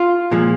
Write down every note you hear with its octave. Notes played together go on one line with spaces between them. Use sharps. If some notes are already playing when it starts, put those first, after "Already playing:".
Already playing: F4
A#2 F3 G#3